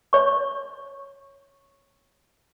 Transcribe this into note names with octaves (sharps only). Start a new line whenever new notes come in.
C#5 C#6